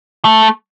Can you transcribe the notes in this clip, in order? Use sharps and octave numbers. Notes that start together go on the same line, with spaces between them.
A3